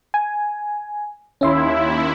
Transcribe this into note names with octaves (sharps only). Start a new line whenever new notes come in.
G#5
D#2 C#4 E4 E5 C6